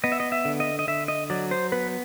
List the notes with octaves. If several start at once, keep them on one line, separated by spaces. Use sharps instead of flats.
B3 D#5
E5
D#5
E5
D3
D#5
D#5
D3 E5
D#5
F#3 D5
C5
B3 B4